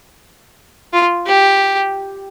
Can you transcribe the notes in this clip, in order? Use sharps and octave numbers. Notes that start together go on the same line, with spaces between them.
F4
G4